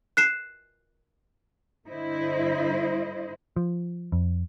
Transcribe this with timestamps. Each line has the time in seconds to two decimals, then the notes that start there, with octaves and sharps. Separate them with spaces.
0.17 F#6 C7 E7
1.88 G2 D3 E4 C5 D#5
3.56 F3
4.12 F2